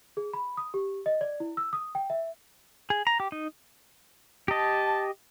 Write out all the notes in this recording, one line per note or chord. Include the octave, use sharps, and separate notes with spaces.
G#4
B5
D#6
G4
D#5
D5
E4
E6
D#6
G5
E5
G#4
A#5
G4
D#4
G4 D#5 A5